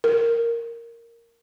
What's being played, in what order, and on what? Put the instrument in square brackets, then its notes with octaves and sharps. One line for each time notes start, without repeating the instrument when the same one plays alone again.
[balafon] A#4